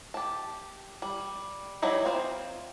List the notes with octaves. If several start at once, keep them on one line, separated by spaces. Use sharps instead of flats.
G4 A5
G3
E3 F#3 G3 D#4 E4
C4 F4 C5